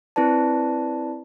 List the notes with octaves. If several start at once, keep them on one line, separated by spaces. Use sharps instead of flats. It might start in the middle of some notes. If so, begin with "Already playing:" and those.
C4 E4 B4 D5 A5